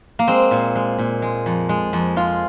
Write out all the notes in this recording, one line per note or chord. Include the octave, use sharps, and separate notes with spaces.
A#3
G#3 C4
A#2
G#3
A#2
G#3
F2
G#3
F2
G#3 F4